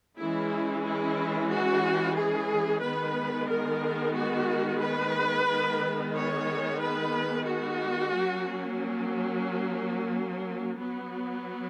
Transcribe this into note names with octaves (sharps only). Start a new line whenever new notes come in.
E3 G#3 C#4 E4
E4
F#4
G#4
D#3 G#3 B3 B4
A#4
F#4
B4
D#3 G#3 B3
C#5
B4
F#4
F#3 A#3 C#4
F#3 B3